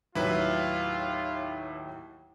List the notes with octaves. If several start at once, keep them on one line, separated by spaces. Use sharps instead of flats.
D#2 A2 F#3 E4 F4 B4